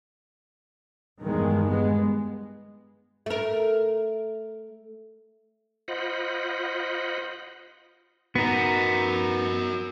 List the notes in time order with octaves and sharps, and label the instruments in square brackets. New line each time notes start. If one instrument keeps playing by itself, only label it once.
[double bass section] E2 G2 D#3 G#3
G#3 B3
[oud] A3 A#4
[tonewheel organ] F4 C5 D#5 F#5 B5
[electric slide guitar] B3 D#4 [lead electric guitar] F#4 A#4